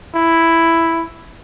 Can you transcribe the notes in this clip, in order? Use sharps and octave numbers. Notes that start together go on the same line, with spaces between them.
E4